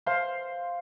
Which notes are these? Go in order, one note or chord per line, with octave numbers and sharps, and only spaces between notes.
C5 F5 C6